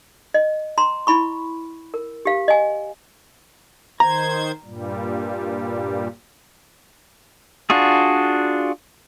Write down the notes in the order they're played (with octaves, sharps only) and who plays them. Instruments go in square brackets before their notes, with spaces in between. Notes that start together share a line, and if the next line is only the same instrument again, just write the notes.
[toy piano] D#5
A#5 C6
E4 B5 C#6
A#4
G4 F5
D#5 G#5
[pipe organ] D#3 C5 G#6 [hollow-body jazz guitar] A#5
[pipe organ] G2 A#2 G3
[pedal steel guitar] D4 F4 F#4 G#4